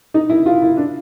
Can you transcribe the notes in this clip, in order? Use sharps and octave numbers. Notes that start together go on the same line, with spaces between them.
D#4
E4
F4
E4
D4